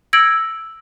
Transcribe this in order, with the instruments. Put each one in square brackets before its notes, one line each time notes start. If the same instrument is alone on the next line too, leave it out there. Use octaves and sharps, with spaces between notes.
[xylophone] E6 G#6 A#6 C#7 D7 F#7